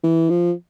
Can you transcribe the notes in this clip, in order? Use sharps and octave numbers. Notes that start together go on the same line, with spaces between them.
E3
F3